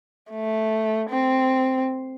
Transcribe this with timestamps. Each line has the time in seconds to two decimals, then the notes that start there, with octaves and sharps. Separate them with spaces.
0.31 A3
1.10 C4